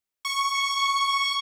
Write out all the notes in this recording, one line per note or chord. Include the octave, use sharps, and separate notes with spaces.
C#6